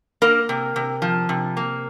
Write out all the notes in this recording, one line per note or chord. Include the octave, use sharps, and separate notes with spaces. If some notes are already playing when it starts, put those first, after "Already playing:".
A#3 A#4
C3
C3
F3
C3
A#3